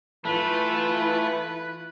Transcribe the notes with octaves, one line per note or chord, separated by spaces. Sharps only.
E3 A3 E4 F4 B4